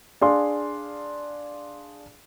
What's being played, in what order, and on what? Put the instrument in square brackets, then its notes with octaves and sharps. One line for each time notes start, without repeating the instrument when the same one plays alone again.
[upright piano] D4 G#4 F5 C6